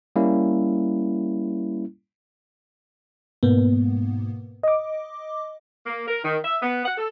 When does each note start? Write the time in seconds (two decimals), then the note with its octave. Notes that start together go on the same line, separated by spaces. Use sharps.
0.16 G3 A#3 C#4 E4
3.43 G#2 B2 A#3 B3
4.63 D#5 D6
5.87 A#3
6.08 A#4
6.24 D#3
6.45 E5
6.63 B3
6.86 F#5
6.97 A4